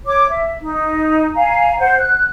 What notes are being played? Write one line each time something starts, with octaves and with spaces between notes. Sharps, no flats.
C#5 D6
E5
D#4
F5 G#5 A#5
C5 F#5
F#6